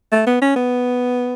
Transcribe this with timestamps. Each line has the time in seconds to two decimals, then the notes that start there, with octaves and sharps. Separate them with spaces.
0.12 A3
0.27 B3
0.41 C#4
0.56 B3